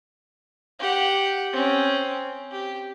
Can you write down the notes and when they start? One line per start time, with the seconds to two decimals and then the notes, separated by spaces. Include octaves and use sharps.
0.79 G4 F#5
1.52 C4 C#4
2.52 G4